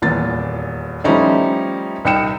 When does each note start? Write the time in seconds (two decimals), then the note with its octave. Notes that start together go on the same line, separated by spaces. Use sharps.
0.02 D#1 E2 A#2 A6
1.04 F3 G3 A3 C#4 D#4 E4
2.05 C2 D#4 G5 C#7 E7